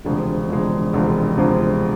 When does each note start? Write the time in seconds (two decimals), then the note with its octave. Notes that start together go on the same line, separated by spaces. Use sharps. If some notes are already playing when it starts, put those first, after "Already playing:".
0.05 E1 D2 C3 F3 G#3
0.48 E1 D2 C3 F3 G#3
0.93 E1 D2 C3 F3 G#3
1.37 E1 D2 C3 F3 G#3